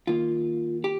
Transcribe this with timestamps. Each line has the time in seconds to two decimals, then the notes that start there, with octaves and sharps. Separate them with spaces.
0.07 D#3 A#3 F4
0.84 G4